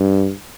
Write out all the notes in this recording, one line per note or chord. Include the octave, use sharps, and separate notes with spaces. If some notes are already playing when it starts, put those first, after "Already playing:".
Already playing: G2